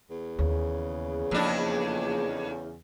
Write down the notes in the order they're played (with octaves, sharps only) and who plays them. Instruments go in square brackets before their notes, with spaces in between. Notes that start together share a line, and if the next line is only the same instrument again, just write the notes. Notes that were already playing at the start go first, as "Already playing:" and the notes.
[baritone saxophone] E2
[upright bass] D#2 [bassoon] C#3
[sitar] F2 D4 [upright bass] A#3